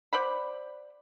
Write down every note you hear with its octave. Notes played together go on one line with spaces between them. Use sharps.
C5 D5 F#5 B5